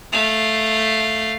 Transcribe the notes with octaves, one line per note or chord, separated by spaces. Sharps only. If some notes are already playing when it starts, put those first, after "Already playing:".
A3 F5